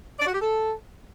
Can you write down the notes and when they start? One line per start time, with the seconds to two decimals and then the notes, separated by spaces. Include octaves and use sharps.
0.19 D5
0.27 F#4
0.34 G4
0.41 A4